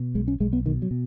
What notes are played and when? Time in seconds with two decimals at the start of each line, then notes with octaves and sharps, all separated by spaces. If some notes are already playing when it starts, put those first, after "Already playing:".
Already playing: B2
0.15 B1 G#3
0.28 C#4
0.40 B1 G#3
0.53 B3
0.65 B2 D#3
0.82 F#3
0.91 B2